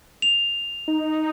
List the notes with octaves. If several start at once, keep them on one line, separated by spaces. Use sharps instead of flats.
F7
D#4